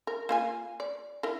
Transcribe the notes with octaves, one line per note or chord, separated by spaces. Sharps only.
A#4
A#3 F4 G#5
D5
E4 A#4